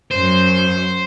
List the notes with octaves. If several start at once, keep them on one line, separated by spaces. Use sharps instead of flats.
F#2 C5